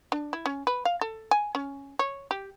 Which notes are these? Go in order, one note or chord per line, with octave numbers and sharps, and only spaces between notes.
D4
E4
C#4
B4
F5
A4
G#5
C#4
C#5
G4